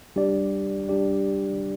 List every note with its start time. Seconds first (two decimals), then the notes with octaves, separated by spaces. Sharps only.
0.16 G3 D4 G4 D5
0.89 G3 D4 G4 D5